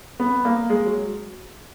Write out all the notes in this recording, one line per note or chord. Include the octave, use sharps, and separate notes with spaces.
B3
A#3
G#3
F#3